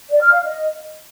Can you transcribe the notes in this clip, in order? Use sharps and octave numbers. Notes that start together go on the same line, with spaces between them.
D5
F6
F5
D#5